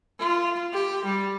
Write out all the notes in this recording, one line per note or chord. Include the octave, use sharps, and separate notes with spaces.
F4
G4
G3